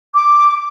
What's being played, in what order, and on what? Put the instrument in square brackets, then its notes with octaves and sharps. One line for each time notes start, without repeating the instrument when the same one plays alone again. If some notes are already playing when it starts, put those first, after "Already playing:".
[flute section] D6